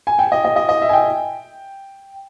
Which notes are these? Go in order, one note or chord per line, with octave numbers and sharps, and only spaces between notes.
G#5
G5
D#5
D#5
D#5
D#5
E5
G#5
G5